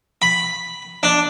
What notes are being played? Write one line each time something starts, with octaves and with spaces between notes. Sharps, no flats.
B5
D4